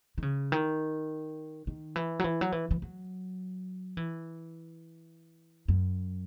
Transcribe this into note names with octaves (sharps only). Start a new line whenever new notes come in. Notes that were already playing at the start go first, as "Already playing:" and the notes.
D#3
C#3
D#3
D#3
E3
F#3
E3
F#3
E3
E3
F#3
E3
F#2